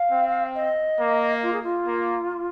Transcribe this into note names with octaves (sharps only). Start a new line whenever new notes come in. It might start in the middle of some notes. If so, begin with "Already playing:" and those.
Already playing: F5
C4
D#5
A#3
F4
G#4
F4
A#3